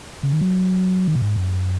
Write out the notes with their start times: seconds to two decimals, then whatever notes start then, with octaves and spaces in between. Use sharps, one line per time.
0.23 C#3
0.33 D#3
0.41 F#3
1.08 D#3
1.15 B2
1.22 G#2
1.36 F#2